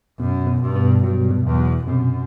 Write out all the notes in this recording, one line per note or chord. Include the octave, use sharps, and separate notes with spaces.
F#2 B2
B2
G2
B3
G2 F#3
B2
E2
B2
F#2 C3